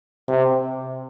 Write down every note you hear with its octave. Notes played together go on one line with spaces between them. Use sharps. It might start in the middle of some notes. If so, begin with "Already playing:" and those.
C3